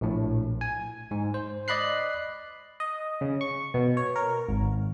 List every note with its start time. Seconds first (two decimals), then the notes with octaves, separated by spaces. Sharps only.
0.01 A#1 A2
0.61 G#5
1.11 G#2
1.34 C5
1.68 D5 D#5 B5 F#6 C7
2.80 D#5
3.21 C#3
3.41 C#6
3.74 B2
3.97 C#5
4.16 A#4
4.49 G#1